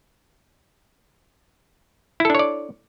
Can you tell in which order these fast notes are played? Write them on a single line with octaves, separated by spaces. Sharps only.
E4 A4 D4 C#5 D5